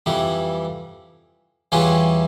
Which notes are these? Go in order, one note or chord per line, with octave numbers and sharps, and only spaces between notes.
F2 E3 G3
E2 E3 G3 C#4 F4